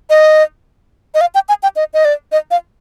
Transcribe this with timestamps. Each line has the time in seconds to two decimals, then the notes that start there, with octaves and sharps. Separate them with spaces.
0.10 D#5
1.14 D#5
1.21 F5
1.35 G5
1.49 G#5
1.63 G5
1.76 D#5
1.94 D#5
2.05 D5
2.32 D#5
2.51 F5